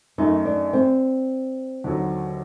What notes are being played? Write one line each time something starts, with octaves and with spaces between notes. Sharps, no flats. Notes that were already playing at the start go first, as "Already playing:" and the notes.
F#2 D#3 A3 D#4
D4
C4
D#2 D3 F#3